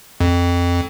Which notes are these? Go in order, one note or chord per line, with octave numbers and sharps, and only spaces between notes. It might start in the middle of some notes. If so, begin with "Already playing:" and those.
F2